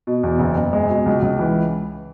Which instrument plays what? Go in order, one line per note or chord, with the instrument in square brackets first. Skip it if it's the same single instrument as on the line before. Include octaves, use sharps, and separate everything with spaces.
[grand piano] B2
E2
F#1
F#1
G#3
B2
C#2
C#2
E3